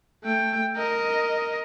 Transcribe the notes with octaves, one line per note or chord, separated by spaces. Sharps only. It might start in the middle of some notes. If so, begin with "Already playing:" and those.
A3 G5
A#4 D#5